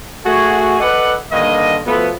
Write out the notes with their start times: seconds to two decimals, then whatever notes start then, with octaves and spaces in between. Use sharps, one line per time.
0.25 A3 F#4 G#4
0.80 A4 B4 D5 D#5 F#5
1.32 G2 D3 D#3 A#3 D#5
1.86 B2 F3 A3 B3